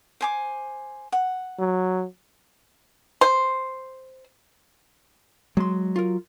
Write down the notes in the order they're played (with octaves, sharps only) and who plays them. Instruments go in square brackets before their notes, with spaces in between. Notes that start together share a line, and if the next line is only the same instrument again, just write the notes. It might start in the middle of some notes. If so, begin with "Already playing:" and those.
[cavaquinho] C5 G#5 D6
F#5
[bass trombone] F#3
[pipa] C5
[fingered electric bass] F#3 [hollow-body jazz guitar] G#3 C6
[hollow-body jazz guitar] F4 A#4